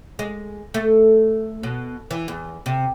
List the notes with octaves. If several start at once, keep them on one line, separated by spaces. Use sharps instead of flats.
G#3
A3
B2
E3
E2
C3